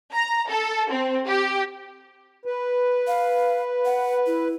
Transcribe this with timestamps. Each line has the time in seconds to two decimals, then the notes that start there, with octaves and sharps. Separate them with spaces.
0.14 A#5
0.49 A4
0.89 C4
1.27 G4
2.46 B4
3.07 F5
3.85 F#5
4.27 E4